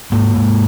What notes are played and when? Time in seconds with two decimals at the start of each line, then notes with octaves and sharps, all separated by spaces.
0.12 G#2 A#3
0.35 G#2